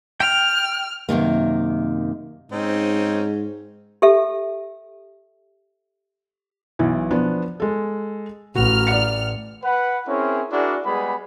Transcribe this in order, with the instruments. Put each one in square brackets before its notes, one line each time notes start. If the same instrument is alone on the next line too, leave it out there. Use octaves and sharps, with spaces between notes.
[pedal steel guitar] G5 [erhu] F6
[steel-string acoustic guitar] F#2 C3 D#3 A#3
[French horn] G#2 [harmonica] C4 C#4 D#4
[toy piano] G4 A4 E5
[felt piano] B1 E3
F3 B3 D4
G#3 A4
[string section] A1 F6 [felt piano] F#4
[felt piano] D5 F#5 C#7
[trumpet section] B4 F#5
C4 C#4 E4 G#4 A#4 C#5
D4 E4 F#4 G#4 A#4 D5
G3 G#3 B3 G#4 B5